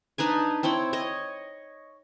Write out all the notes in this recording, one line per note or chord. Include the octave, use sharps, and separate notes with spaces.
D4 D#4 B4 G#5
C4 E4 C#5 G5
C#5 D#5